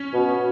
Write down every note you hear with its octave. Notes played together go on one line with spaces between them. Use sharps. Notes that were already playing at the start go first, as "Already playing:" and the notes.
Already playing: C#4
B2